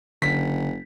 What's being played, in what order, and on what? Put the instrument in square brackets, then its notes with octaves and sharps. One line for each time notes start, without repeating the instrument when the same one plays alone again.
[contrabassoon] F#1 [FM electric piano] D3 [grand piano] B6